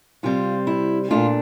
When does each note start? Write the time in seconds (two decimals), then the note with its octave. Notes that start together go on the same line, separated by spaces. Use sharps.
0.23 C3 G3 C4 F4
0.67 E4
1.11 A#2 A3 D4 F4